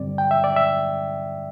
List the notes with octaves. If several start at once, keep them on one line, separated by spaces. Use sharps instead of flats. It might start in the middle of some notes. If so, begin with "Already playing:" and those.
Already playing: G2 D3 G3 C4 D5
G5
E5
D5
E5